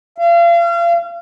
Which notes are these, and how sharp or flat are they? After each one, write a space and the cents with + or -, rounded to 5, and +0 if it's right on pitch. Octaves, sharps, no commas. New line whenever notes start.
F5 -35